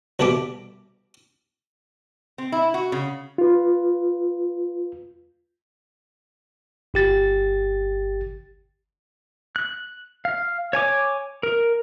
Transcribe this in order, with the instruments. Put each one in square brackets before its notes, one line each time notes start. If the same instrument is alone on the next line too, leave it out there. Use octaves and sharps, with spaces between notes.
[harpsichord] C2 B2 E4 A4 E5 D6
[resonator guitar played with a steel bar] C4
E4
F#4
C#3
[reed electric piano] F4 B4
[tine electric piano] G1 G4 A6
[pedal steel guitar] F#6
F5
C#5 G#5 D6
A#4